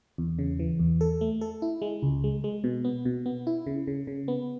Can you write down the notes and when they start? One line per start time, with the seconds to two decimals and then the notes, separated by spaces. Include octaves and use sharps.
0.18 E2
0.39 C#3
0.59 E3
0.79 E2
1.01 A4
1.21 A3
1.41 A4
1.62 E4
1.82 G#3
2.03 C#2
2.24 G#3
2.44 G#3
2.64 B2
2.84 B3
3.05 B2
3.26 B3
3.47 E4
3.66 C#3
3.87 C#3
4.07 C#3
4.28 B3